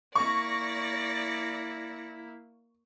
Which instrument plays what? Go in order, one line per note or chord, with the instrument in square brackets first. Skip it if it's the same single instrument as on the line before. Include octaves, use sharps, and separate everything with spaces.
[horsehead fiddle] A#3 E4 [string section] D5 A#6 C#7 [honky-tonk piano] C#6